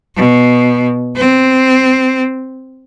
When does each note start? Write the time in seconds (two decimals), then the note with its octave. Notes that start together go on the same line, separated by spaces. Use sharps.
0.16 B2
1.16 C4